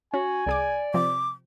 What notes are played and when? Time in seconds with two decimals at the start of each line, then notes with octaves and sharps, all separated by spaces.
0.14 C#4 F#4 G#5
0.47 C2 G#4 D5 D6
0.94 C3 F3 C4 D6